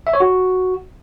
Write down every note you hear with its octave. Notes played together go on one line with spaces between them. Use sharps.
E5
C#5
F#4